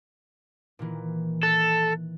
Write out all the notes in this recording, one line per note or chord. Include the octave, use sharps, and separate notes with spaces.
A#2 D#3 E3
A4 F#6 A6